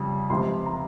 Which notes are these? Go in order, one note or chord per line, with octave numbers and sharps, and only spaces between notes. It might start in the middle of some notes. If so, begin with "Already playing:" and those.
Already playing: F2 C#3 G3
C#2 C3 F3 C4 C6
A#5